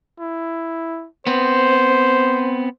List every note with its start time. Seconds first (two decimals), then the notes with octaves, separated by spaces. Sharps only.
0.20 E4
1.27 B3 C4 C5